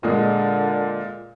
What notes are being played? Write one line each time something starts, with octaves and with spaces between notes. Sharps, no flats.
A#2 D3 G#3